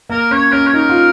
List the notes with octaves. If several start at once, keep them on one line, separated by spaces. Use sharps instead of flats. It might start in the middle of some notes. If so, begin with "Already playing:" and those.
A#3 A#4
C#4 C#5
C#4 A#4
C#5
D#4 A#4
F4